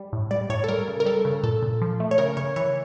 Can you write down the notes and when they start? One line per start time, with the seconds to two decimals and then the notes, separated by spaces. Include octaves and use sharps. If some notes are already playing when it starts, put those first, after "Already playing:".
Already playing: G3
0.13 A2
0.31 G3 D5
0.50 A2 C#5
0.64 A4
0.68 G3 A#4
0.88 C#3
1.00 A#4
1.06 G3 A4
1.25 C#3
1.43 A#2 A4
1.63 A#2
1.81 F3
2.00 A3
2.11 C#5
2.18 C#3 A#4
2.37 C#3 C#5
2.56 E3 C#5